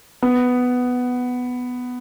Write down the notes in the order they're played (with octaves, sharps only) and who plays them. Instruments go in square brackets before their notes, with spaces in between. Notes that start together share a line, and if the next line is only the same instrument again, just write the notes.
[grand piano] B3